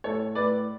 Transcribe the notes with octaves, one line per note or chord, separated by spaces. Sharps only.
A2 A4 C#5
A2 B4 D5